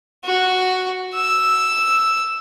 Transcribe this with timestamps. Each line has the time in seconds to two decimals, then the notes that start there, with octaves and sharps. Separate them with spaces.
0.25 F#4
1.15 E6